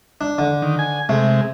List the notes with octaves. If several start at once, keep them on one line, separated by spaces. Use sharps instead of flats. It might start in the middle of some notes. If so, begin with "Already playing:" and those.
D4
D3
D#3
G#5
C3 G#3 A3